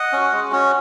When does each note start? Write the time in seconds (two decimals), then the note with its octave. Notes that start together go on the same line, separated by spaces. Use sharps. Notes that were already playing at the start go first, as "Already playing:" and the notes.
Already playing: D#5 F#5
0.13 C#4 F#4
0.32 G#3
0.52 C#4 F#4